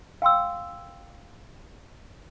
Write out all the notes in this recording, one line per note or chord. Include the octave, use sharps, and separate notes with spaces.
F5 G5 C6 E6